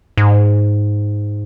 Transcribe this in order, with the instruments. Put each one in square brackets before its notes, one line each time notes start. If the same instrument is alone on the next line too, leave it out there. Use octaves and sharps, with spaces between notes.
[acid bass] G#2